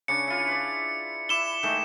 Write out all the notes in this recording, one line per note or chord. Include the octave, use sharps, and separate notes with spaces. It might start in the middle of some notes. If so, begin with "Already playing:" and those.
C#3 D4 C#5 C#7
E4 F4
B4 D5
E4 D6 E7 G7
D#3 G#3 A3